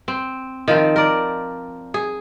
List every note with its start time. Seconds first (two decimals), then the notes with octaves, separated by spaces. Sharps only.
0.08 C4
0.68 D#3 F3 C4
0.96 A#4 D5
1.94 G#4